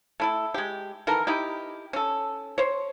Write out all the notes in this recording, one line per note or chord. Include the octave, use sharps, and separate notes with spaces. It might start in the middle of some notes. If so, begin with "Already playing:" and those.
A3 E4 A4
G#3 G4
D#3 E3 A4 A#4
D#4 E4 G4
C#4 A4
C5 C#5